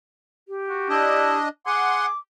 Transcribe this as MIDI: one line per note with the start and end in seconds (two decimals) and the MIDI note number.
0.48 1.38 67
0.69 0.86 66
0.90 1.49 62
0.90 1.37 64
0.90 1.49 75
1.66 2.07 68
1.66 2.06 78
1.66 2.06 84
1.66 2.18 86